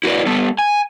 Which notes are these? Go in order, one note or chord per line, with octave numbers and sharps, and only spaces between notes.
E4 F#4 A#4 B4 D5
G3 B3 A4
G#5